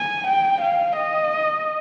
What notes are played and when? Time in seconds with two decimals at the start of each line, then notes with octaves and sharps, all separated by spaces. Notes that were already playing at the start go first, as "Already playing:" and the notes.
Already playing: G#5
0.27 G5
0.61 F5
0.96 D#5